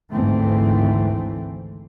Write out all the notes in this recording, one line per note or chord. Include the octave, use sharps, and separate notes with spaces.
G#1 D2 G#2 E3 A3 C4